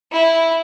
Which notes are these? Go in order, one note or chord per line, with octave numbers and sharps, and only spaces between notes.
E4